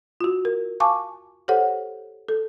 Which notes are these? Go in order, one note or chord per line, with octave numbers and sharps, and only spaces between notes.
F4 F#4
A#4
F5 G#5 A5 C#6 D6
G4 A4 C5 C#5 F#5
A4